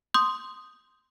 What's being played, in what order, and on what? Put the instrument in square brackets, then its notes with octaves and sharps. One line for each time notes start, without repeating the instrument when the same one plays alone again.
[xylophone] C6 D#6 G6